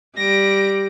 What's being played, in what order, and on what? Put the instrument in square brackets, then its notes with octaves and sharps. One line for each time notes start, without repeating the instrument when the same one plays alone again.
[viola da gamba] G3 [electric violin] A#6 D7